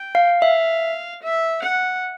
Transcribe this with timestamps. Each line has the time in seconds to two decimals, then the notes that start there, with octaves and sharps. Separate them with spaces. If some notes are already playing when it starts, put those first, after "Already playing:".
Already playing: G5
0.15 F5
0.41 E5 F5
1.22 E5
1.62 F#5